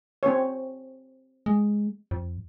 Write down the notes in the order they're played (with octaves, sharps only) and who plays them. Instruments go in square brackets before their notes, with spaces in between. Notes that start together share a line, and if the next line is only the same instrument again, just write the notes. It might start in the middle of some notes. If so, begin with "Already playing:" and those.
[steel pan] C4 C#5
[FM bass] G#3
F2